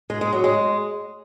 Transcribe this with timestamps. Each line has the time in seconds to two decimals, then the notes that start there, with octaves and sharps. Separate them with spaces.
0.10 G#3
0.21 G#3
0.33 F#3
0.44 G#3